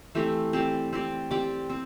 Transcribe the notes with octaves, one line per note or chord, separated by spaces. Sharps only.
E3 A3 C4 G4
C4 G4 D5
C4 G4 D5
C4 G4 D5
C4